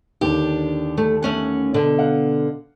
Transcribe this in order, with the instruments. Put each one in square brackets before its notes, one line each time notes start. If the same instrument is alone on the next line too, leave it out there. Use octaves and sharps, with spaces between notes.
[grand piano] D#2 D3 [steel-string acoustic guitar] D4 G4
[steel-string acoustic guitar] A3
A3 C#4 F#5
B2 D3
[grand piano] F5 F#5